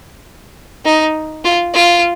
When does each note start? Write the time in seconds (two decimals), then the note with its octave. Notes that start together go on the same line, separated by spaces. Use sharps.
0.85 D#4
1.44 F4
1.74 F4